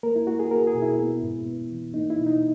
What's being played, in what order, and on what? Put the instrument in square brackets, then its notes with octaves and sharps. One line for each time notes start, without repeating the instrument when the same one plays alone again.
[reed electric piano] A#3 A#4
E4
A#3 F#4
G#4
A#3 A#4
G#4
B2
E4
B3
G#2
B3
E3
A#3 D#4
E4
B2
D#4